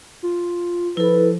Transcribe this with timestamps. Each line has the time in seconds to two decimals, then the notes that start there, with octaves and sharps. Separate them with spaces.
0.23 F4
0.97 F3 E4 A4 B4